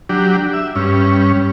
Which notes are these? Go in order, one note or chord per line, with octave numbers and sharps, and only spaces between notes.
F#3 D4 G4
E5
G2 C#4